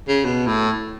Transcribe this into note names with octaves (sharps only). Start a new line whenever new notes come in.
C#3
B2
A2